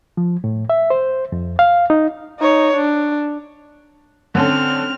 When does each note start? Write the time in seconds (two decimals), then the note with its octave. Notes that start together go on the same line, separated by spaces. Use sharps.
0.17 F3
0.44 A2
0.70 E5
0.90 C5
1.32 F2
1.59 F5
1.90 D#4
2.39 D#4 C#5
2.77 D4
4.35 D3 C4 C#4 A4 F6